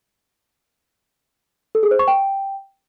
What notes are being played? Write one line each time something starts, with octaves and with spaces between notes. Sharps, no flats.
A4
G#4
C5
C#6
G5